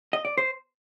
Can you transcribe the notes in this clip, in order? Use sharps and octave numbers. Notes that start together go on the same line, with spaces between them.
D#5
D5
C5